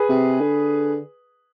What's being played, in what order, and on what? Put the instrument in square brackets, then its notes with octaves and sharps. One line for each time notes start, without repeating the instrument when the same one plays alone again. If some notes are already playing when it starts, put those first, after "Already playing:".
Already playing: [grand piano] G#4 B4
[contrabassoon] C3
D3